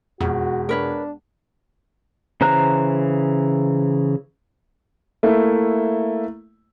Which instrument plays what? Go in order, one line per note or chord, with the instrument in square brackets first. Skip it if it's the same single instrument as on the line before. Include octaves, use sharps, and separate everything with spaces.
[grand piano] E1 [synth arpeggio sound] F2 [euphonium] F#4
[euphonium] D4 [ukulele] A#4 B4 C#5
[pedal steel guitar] C#3 E3 C5 A#5 F#6
[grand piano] A3 A#3 E4